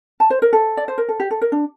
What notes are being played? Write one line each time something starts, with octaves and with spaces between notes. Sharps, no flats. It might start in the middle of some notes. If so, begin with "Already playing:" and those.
A5
C5
A#4
A4
D5
C5
A#4
A4
G4
A4
A#4
D4